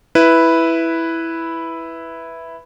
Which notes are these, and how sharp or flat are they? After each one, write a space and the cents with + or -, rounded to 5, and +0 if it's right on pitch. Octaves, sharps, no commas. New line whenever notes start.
E4 +0 B4 +0